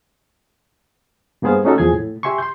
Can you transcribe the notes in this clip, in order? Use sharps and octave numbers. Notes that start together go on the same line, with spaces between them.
G2 A#3 B3 G#4 C5 F5
A3 C#4 D#4 F#4 A4
E2 F3 G#4 G#5 G#6
A2
G4 E5 G#5 C6 C#6
C6 G6